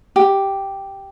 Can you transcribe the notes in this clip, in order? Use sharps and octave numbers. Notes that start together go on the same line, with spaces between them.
G4